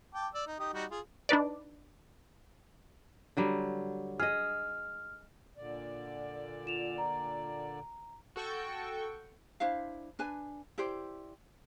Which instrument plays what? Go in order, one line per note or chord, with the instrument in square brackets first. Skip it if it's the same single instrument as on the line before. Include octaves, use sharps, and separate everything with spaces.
[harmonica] G5 A5 D6
D5 E6
D#4
D#4 G4 D#6
G3 D#4 F#4
F4 G#4
[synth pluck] D4 D#4 B4 D5
[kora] D3 F#3 G3
[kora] G#4 D#5 [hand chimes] F6
[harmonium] A#2 D3 D5
[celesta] F4 E7 F7
A#5
[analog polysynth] F#4 A4 G5 C#6
[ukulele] D4 E4 C5 F5
D4 B4 G#5
E4 G4 C5 D5